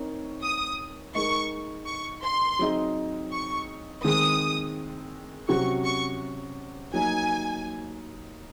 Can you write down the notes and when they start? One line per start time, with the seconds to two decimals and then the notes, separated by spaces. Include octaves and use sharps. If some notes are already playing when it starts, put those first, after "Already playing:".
Already playing: C4 D#4 A#4 C#5
0.42 D#6
1.15 G#3 D#4 A#4 D#5 C#6
1.87 C#6
2.24 C6
2.59 F#3 C4 D#4 G#4 D#5
3.32 C#6
4.04 D#3 G#3 C4 D#6
5.48 C3 F#3 C#4 F#4 C#6
5.85 C#6
6.93 F#3 A#3 D#4 G#5